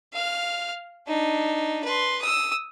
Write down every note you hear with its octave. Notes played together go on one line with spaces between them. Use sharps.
F5 F6
D4 D#4
B4 C6
D#6 E6